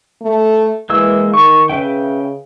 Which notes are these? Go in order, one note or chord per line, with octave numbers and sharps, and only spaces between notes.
A3
E3 G#3 A#3 E6
D#3 C#6
C#3 B4 E5 G5